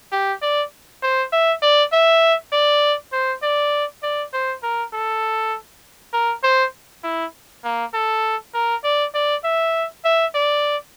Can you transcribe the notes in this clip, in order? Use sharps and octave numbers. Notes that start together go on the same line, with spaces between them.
G4
D5
C5
E5
D5
E5
D5
C5
D5
D5
C5
A#4
A4
A#4
C5
E4
A#3
A4
A#4
D5
D5
E5
E5
D5